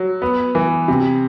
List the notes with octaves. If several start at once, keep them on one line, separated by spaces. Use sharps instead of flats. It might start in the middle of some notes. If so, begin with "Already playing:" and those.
Already playing: F#3
B3
E3
C3